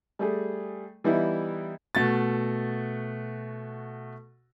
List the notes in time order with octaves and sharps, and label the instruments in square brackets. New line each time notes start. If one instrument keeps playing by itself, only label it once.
[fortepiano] G3 A3 G#4
E3 G3 B3 D#4 E4
[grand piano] B2 A3 F#4 A6